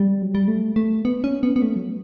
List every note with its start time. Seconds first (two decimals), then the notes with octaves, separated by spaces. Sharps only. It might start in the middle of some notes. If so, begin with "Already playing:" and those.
Already playing: G3
0.22 F#3
0.35 G3
0.48 A3
0.76 A3
1.05 B3
1.24 C#4
1.43 B3
1.56 B3
1.62 A3
1.76 F#3